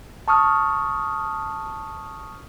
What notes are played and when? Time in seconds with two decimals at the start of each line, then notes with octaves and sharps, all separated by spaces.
0.28 A5 C#6 D#6 F6